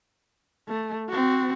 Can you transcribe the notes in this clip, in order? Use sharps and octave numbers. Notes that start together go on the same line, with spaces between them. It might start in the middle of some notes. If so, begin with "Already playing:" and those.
A3
C4 F#4